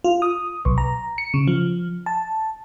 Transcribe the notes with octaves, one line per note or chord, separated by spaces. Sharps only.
F4
D#6
B1
A#5
C#7
C#3
F3
A5